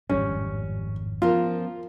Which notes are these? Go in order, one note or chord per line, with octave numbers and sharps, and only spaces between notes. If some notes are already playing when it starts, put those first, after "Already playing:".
G#1 F2 A2 G3 C#4
F3 B3 C#4 F4 A#4